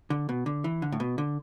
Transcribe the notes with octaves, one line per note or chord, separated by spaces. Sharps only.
D3
B2
D3
E3
D3
A2
B2
D3